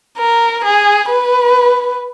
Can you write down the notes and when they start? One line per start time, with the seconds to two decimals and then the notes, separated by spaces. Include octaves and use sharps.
0.17 A#4
0.65 G#4
1.10 B4